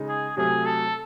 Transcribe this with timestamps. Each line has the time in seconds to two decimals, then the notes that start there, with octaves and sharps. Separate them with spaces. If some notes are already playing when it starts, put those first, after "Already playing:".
Already playing: C#3 G#3 D#4
0.08 G#4
0.37 C3 F#3 A3 G#4
0.66 A4